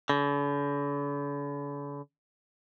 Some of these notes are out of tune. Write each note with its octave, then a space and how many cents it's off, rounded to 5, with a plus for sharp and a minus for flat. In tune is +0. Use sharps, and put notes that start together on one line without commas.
D3 -45